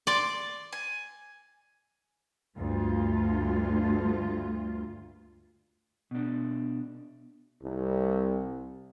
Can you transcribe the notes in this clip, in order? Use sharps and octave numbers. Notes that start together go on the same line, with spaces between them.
D5 C6 D6
G#5
D2 G2 F4
B2 D4
C2